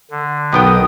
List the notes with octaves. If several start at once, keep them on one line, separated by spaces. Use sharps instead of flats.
D3
B1 D#3 B3 G5 D#6